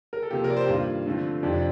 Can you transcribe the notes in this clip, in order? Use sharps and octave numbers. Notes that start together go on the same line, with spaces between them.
A#4
A4
C3 F3 A#3 G4
A#4
D5
C5
G4
G2 D#3 A#3 F4
D3 F3 A3 C4
F2 C3 F3 D4
D4